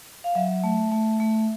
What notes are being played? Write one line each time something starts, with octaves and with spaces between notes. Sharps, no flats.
F5
F#3 E5
A3
A3
A3